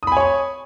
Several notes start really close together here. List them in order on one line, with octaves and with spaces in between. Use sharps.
D#6 B5 G#5 C#5